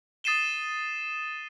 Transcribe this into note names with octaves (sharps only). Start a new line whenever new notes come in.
D#6 A6 C7 D#7 E7 G7